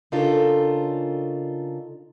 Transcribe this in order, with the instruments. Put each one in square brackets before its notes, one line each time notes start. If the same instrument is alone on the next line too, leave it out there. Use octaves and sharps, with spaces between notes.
[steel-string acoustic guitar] C#3 D4 D#4 F4 A4 A#4